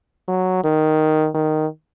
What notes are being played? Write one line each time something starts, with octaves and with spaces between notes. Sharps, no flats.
F#3
D#3
D#3